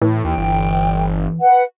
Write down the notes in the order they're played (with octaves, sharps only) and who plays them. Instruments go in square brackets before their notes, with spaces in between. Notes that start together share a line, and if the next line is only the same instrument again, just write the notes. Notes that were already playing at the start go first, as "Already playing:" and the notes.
[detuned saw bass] A2 [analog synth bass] E3
[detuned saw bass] D#2 [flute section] G5
[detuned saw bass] G1
[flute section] B4 F#5